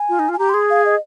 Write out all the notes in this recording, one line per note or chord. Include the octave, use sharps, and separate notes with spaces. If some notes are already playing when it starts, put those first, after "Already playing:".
Already playing: G#5
F4
D#4
F4
G#5
G4 A#5
C6
G#4
F5
D#5